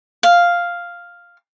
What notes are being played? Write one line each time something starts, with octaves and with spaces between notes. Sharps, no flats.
F5